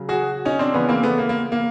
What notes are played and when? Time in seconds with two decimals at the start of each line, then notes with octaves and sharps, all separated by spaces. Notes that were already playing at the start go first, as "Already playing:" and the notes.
Already playing: C#3 F#3
0.09 F#4 G#4
0.45 C#4 D#4
0.59 C4 D4
0.74 C#3 E3 B3 C#4
0.89 A#3 C4
1.03 A3 B3
1.18 A#3
1.29 A#3
1.52 A#3